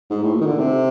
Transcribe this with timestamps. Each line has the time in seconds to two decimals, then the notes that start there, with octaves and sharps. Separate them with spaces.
0.10 G#2
0.22 A2
0.34 A#2
0.41 D#3
0.46 D3
0.58 C3